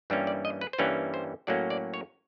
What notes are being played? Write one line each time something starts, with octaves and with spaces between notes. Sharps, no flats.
G2 E3 G3 A#3 C#4
D5
D#5
B4
C5
G2 E3 G3 A#3 C#4 B4
C5
A2 F#3 A#3 C#4 D5
D5
C#5